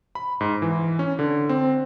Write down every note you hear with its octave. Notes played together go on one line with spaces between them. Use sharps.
B5
G#2
E3
C#4
D3
C4